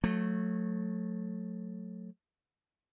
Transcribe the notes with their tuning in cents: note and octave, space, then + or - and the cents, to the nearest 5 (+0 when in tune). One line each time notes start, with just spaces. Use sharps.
F#3 -25 A3 +0